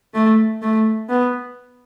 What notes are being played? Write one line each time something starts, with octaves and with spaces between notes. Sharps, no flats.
A3
A3
B3